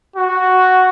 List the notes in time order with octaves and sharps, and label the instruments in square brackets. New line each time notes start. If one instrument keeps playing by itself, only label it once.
[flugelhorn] F#4